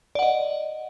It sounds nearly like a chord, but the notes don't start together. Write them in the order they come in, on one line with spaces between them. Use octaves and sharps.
D5 F#5 D#5